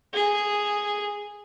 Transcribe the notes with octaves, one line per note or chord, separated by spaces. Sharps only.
G#4